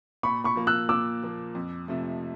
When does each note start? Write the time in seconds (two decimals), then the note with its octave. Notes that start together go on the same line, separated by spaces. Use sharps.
0.23 A#2 B5 C#6
0.44 B5 C#6
0.56 F3 A#3
0.67 E6 F#6
0.89 A#2 D6 E6
1.23 F3 A#3
1.55 F2
1.88 C3 F3 A3